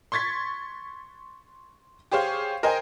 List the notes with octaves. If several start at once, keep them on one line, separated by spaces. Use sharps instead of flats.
C6 C#6 G#6 A6 B6
G4 G#4 C5 C#5 F5
A#4 C5 D#5 G5 G#5